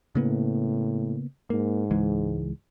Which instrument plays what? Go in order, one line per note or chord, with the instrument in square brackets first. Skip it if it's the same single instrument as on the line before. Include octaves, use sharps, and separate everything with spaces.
[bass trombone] A2 [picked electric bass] C#3 A#3 B3
[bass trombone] G#2 [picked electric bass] A#3
[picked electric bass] C#2 E3 G#3